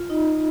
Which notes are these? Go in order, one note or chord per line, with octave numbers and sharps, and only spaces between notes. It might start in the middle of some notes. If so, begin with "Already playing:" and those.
Already playing: F4
D#4 D#5